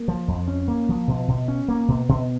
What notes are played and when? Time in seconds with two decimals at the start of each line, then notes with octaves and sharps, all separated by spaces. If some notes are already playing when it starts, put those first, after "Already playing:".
Already playing: A#3
0.08 F3
0.28 F2
0.48 C#4
0.68 A#3
0.89 F3
1.08 B2
1.28 B2
1.48 C#4
1.68 A#3
1.88 B2
2.09 B2